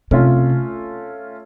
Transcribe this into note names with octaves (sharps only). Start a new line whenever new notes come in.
C3 A3 C#4 F4